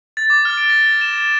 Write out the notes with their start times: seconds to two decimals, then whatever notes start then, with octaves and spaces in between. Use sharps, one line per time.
0.17 A6
0.30 D6
0.45 F6
0.57 D7
0.70 A#6
0.86 G#6
1.01 E7
1.18 E7